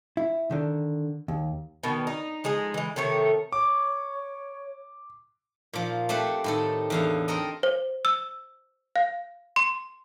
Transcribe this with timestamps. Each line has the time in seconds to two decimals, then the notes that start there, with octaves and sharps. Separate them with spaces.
0.17 E4
0.51 D3 D#3
1.28 D#2
1.83 B2 D#3 G3
2.07 D#4
2.44 F3 G#3 D#4 G#4
2.74 E3 G#3
2.96 C3 D#3 A3 C#5
3.52 C#5 D6
5.73 A#2 F3
6.09 A3 C4 G4 C5 F#5
6.44 A2 D#3 A4
6.90 E2 D3 F5
7.28 C4 A4 A#4 D#5
7.63 C5
8.05 E6
8.96 F5
9.56 C6